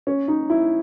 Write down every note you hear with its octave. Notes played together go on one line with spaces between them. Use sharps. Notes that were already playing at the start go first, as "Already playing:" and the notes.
C#4
D#4
E4